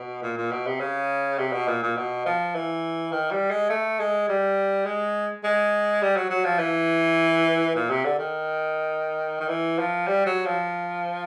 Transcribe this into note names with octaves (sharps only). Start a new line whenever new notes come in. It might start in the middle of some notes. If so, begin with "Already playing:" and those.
Already playing: B2
A#2
A#2
B2
C3
C#3
C3
B2
A#2
A#2
B2
F3
E3
D#3
G3
G#3
A3
G#3
G3
G#3
G#3
G3
F#3
F#3
F3
E3
A#2
C3
D3
D#3
D#3
E3
F3
G3
F#3
F3